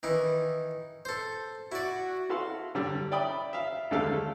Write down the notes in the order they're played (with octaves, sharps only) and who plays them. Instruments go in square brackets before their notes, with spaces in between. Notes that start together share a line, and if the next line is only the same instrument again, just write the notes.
[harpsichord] D#3 E3 E4
A4 C5
[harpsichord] E4 D5 [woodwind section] F#4
[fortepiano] E4 F#4 A4 F5 C6
D3 G3
D5 E5 G5 B5 D#6
E5 F5
D#2 D3 G#3 A3 A4 F5